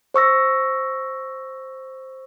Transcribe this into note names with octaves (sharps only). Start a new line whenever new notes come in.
C5 C#6 E6 A#6